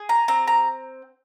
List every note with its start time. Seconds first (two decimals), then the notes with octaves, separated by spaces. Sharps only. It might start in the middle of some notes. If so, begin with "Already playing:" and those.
Already playing: G#4
0.09 A#5
0.28 C4 A#5
0.48 A#5